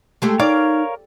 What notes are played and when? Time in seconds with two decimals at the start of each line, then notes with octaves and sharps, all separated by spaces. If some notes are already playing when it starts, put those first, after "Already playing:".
0.22 G#3 A3 G4
0.40 D#4 A#4 C#5 D5 F5